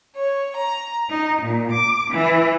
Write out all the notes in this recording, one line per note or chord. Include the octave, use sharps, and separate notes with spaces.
C#5
A#5
D#4
A#2
D6
E3